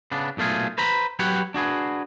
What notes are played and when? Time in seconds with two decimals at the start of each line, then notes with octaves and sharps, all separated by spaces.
0.12 C#3 B3 D4
0.37 B1 A#2 A3 F4 G#4
0.78 B4 C5 A#5 B5
1.19 F#3 G4 B4 C#5 F#5
1.54 D4 F#4 G#4 B4